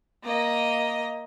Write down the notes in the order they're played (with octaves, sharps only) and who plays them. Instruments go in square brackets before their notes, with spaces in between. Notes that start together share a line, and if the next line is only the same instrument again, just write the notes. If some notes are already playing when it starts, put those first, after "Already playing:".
[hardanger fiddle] A#3 D#5